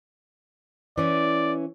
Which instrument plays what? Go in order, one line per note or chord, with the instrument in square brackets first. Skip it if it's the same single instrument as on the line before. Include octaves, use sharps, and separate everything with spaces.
[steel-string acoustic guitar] E3 C#4 [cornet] D5